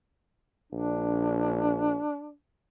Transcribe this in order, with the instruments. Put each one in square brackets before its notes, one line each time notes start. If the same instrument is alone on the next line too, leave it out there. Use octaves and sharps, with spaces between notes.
[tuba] A#1 [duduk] D4